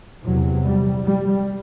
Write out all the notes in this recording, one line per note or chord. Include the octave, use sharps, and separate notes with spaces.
E2 C3 F#3
G3
G3